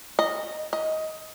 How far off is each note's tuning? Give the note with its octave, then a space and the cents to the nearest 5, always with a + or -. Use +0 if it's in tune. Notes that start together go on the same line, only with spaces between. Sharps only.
D#5 -10
D#5 +15